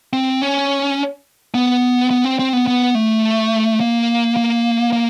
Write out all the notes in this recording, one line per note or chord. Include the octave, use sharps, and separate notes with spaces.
C4
C#4
B3
B3
C4
C4
B3
B3
A3
A#3
A#3
A#3